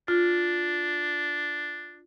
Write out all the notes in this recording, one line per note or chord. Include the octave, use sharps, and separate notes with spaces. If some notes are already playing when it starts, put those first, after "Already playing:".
D4 F4